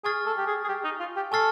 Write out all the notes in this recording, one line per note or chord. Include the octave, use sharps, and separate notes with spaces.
G#4 G#5 C#6 F6 A6
A4
G4
G#4
G#4
G4
D#4
F4
G4
A4 G#5 C#6 F6 A6 C7